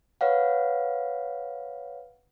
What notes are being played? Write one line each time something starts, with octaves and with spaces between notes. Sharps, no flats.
B4 C#5 F5 F#5